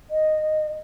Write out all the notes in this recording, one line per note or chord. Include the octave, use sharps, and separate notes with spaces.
D#5